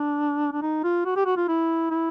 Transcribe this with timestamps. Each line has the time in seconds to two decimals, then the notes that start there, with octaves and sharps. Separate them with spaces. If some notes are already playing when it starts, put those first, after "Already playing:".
Already playing: D4
0.52 D4
0.62 D#4
0.84 F4
1.05 F#4
1.16 G4
1.26 F#4
1.36 F4
1.48 E4
1.91 E4